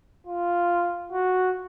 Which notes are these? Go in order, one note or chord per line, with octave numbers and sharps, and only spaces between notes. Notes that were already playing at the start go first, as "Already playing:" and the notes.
F4
F#4